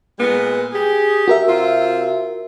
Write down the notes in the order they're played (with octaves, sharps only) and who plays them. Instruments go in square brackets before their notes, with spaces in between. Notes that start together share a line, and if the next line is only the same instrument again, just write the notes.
[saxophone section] A#2 G#3 B3
G4 G#4
[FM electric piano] F#4 A#4 E5
[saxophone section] C3 C4 F4